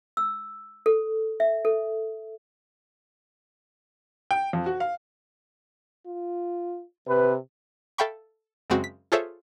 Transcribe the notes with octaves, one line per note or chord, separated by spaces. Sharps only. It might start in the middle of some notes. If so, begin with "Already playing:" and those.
E6
A4
E5
A4
G5
F2
F#4
F5
F4
C3 B4
A4 E5 F5 G5 B5 C#6
F#2 C#3 G#3 C4 F#4
B6
F4 G#4 A4 C5 C#5 E5